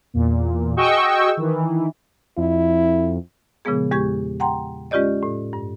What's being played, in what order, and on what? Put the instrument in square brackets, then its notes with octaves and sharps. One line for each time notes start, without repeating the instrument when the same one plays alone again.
[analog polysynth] E2 A#2
F#4 G#4 D#5 G5 C#6 E6
D#3 E3
[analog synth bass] F2 [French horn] E4
[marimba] A#2 C#3 F3 G#3 B3 G#4
E2 G#3 G4 C#6 G#6
F#5 G5 A#5 C6
G#3 C#4 F4 G4 D5 D#5
A2
G2